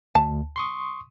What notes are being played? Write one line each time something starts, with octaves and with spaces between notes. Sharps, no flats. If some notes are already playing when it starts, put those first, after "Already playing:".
D2 A5
C6 C#6 D#6